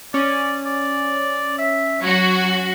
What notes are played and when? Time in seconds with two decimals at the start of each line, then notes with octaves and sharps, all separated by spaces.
0.14 C#4 D5
0.66 D5
1.58 E5
2.02 F#3 F#4 C#5